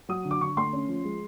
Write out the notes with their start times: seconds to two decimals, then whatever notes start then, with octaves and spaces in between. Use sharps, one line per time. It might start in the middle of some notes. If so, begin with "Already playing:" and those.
0.09 F#3 D#6
0.25 D3
0.31 D6
0.41 D3 C#6
0.57 A3 C6
0.73 C#4
0.88 F3
1.04 G#3